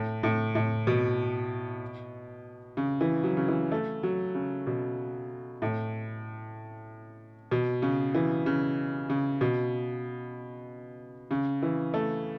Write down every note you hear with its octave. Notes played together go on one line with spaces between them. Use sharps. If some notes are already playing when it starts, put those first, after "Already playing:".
Already playing: A2
A2
A2
B2
C#3
E3
F#3
C#3
E3
A3
F#3
C#3
B2
A2
B2
C#3
E3
C#3
C#3
B2
C#3
E3
A3